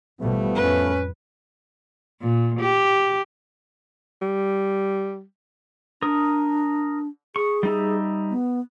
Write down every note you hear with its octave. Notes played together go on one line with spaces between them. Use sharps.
A1 B2 F3 G3 A3 B3
F2 C#4 B4
A#2
G4
G3
D4 A#4 D#6
G#4 C#6
G3 D#4 E5
B3